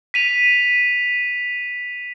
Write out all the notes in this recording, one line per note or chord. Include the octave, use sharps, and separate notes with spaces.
B6 D#7 F7